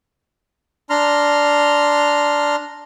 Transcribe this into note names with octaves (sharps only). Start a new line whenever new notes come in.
D4 A#5 C6 F6